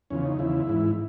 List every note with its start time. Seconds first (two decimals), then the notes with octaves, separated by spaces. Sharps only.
0.10 E2 C#3 F3 C#4
0.25 D#4
0.39 E2 C#3 F3 E4
0.69 G#2 E3